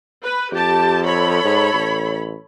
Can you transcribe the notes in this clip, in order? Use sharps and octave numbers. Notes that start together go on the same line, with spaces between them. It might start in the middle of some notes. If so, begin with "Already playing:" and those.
B4
F2 G4 A5
A4 C#5 B5
G#2
A1